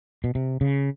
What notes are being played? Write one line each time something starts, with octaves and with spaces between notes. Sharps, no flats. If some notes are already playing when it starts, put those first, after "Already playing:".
B2
C3
C#3